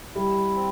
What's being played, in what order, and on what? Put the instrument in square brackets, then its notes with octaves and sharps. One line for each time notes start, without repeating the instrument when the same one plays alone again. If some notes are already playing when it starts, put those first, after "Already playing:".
[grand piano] G3 [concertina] E4
[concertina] C4